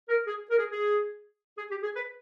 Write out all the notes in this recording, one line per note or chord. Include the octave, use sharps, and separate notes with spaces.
A#4
G#4
A#4
G#4
G#4
G#4
G4
G#4
B4